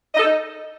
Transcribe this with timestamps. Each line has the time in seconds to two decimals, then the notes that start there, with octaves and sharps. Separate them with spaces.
0.14 D#5
0.20 A4
0.25 D#4